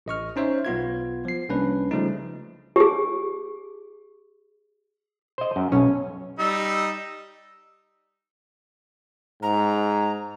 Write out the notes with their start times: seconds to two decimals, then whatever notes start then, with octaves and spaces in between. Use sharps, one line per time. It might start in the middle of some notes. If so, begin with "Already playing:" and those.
0.06 A1 D#5 C#6 F6
0.36 C#4 D#4 C5 C#5 E5
0.65 B1 B3 F4 G#6
1.25 F3 C7
1.49 C2 A#3 C#4 D4 B4
1.91 C#3 F3 G3 A3 D#4
2.76 G4 G#4
5.38 C5 D#5
5.56 F#2
5.72 B1 C#4
6.39 G3 D#4 E6
9.43 G#2 A#5